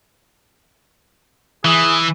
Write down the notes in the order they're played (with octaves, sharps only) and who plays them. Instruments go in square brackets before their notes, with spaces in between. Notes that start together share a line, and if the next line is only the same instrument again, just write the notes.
[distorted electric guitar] E3 [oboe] G#4